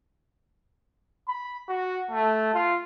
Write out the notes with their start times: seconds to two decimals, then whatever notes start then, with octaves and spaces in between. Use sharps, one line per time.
1.28 B5
1.69 F#4
2.11 A3
2.54 F4